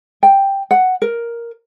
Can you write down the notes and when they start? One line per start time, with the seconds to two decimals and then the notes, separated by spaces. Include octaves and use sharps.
0.23 G5
0.71 F#5
1.02 A#4